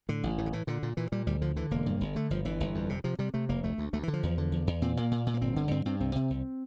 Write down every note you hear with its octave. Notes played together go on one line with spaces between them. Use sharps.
A2 D3
A1
A2 E3
D3
A2 E3
A#2 D3
A#2
A#2 E3
A#2 G3
D2 G3
D3 F3
D3 E3
E1 A#3
G2
G1
D3 A3
G1 F3
G1 E3
G1
F2
C3
C3 F3
C3 G3
C3 A3
F1 A#3
D2 A3
D2
D2 A3
E3
D3
F3
E2
D3
E2
E2
A#2 C4
A#2 A#3
A#2
A#2
A#3
G1 C4
D3
G2 C4
G2 C4
C2 C4
C3
C2